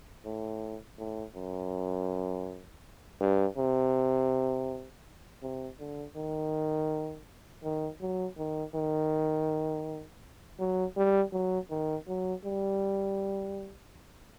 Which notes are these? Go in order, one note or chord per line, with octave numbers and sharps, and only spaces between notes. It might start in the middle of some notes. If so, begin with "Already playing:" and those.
A2
A2
F#2
G2
C3
C3
D3
D#3
D#3
F#3
D#3
D#3
F#3
G3
F#3
D#3
F#3
G3